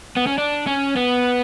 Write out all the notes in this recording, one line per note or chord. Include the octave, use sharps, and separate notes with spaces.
B3
C#4
D4
C#4
B3